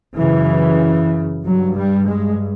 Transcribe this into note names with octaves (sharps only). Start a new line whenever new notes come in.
F#2 C#3 E3
G2 F#3
G3
G#3